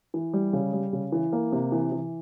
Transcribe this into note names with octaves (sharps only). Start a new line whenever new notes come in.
E3
G3
C#3
G3
C#3
E3
A#3
C3
E3
E3